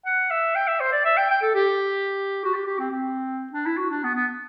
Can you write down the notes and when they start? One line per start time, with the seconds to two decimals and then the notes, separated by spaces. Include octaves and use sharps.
0.06 F#5
0.30 E5
0.55 G5
0.67 E5
0.80 C5
0.92 D5
1.05 E5
1.17 G5
1.30 G5
1.42 A4
1.55 G4
2.44 F#4
2.54 G4
2.66 G4
2.79 C4
2.91 C4
3.53 D4
3.66 E4
3.77 F#4
3.90 D4
4.03 B3
4.15 B3